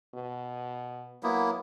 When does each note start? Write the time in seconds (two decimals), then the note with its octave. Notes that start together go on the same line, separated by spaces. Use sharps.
0.15 B2
1.23 F#3 A#3 B3 E4